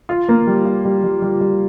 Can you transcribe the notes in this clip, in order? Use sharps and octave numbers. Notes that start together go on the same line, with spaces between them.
F4
A#3
G3
F4
G3
G3
G3
G3